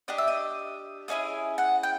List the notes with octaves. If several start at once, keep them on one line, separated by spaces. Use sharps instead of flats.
D4 G4 D#5
E5
D#5
A#3 C#4 E4 G#4 D#5
F#5
G5